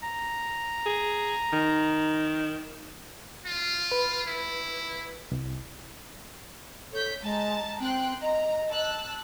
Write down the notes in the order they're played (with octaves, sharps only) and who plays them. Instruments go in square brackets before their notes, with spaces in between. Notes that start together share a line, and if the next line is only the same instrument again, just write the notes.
[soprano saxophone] A#5
[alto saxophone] G#4
D#3
[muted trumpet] F4
[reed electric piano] B4
[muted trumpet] E4
[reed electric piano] C2
[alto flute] A4 [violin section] C#5 G6 B6
[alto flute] G#3 [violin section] A5 A#5 A6
[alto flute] C4 [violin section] G5 C6 F#6
[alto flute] D#5 [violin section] A#5
[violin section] A5 E6 F#6